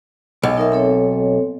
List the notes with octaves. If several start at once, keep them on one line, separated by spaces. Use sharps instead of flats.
B1
D#4 A#4 E5
C4 A4 C#5